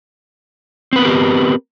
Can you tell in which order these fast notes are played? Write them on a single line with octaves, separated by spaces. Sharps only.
C4 B4 B3 A#4 G4